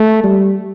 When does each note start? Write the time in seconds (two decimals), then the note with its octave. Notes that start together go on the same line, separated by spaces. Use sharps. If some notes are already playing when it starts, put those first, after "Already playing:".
Already playing: A3
0.23 G3